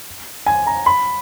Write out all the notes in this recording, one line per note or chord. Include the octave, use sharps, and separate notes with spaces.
G#5
A#5
B5